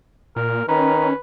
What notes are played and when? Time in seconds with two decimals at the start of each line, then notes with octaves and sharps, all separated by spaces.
0.36 A#2 A#4
0.68 D#3 C#4 B4 A#5